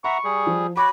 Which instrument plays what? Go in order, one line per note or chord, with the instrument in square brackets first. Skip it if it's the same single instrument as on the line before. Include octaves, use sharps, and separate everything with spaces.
[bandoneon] E5 F#5 A#5 [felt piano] B5 [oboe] C#6
[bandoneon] G3 G#4
[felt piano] F3
[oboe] F#4 [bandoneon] C#5 [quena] B5 [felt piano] D6